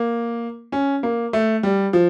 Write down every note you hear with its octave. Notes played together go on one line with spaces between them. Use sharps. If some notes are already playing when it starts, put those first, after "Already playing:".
Already playing: A#3
C#4
A#3
A3
G3
F3